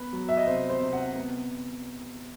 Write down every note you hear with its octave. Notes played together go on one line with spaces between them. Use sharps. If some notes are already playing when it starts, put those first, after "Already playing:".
Already playing: B3 B4
F#3
E5
D#5
C3 C5
C5
C3
F#5
B3